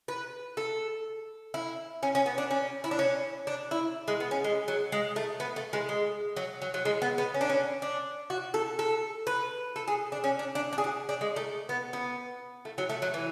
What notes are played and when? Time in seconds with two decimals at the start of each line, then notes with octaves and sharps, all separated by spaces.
0.08 B4
0.57 A4
1.54 E4
2.03 C#4
2.15 C#4
2.26 B3
2.38 D4
2.51 C#4
2.84 E4
2.91 D4
2.99 C#4
3.47 D4
3.71 E4
4.08 G#3
4.20 B3
4.31 C#4
4.44 G#3
4.68 F#3
4.92 G#3
5.16 A3
5.40 B3
5.56 A3
5.73 G#3
5.89 G#3
6.37 F#3
6.62 F#3
6.74 F#3
6.85 G#3
7.02 B3
7.18 B3
7.34 C#4
7.41 D4
7.50 C#4
7.82 D4
8.30 F#4
8.54 A4
8.79 A4
9.27 B4
9.76 A4
9.88 G#4
10.12 D4
10.24 C#4
10.39 D4
10.55 D4
10.73 D4
10.78 G#4
10.84 F#4
11.09 D4
11.21 G#3
11.36 A3
11.69 B3
11.93 B3
12.65 A3
12.78 F#3
12.89 A3
13.02 F#3
13.14 E3